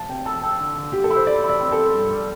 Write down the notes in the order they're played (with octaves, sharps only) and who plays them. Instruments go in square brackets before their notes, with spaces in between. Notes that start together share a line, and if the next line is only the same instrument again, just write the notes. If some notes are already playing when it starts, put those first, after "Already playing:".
Already playing: [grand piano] A5
[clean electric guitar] C3 [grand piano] G5
[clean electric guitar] A4 [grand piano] A5
[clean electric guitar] A4 [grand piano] G5
[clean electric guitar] D3
D3
[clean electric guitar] D3 [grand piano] G4
[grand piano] A4
[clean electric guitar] E4
[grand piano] C5
[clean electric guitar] E4 [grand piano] D5
[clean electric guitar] E4
[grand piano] D5
[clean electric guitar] C4
[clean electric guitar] E4 [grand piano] A4
[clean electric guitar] G2
G3